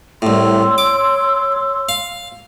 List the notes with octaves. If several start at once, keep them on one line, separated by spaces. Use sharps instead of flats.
C2 A2 C#5 C6 E6
D6
F5